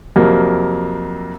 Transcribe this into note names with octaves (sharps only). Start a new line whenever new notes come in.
F2 C3 F#3 A#3